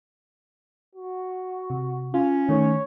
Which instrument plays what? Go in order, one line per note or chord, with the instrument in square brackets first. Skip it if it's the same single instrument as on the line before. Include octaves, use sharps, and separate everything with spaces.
[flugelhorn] F#4
[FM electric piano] C3
[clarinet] C#4 [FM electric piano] F4
[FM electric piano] D#3 A3 [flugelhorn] C#5